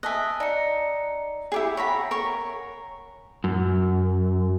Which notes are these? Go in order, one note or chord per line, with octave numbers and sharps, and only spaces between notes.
D#5 E5 G#5 A5 F#6
D#4 D5 C#7
E4 G4 G#4 G5 E6
C#5 F#5 G#5 A#5 B5
A#4 C#5
F#2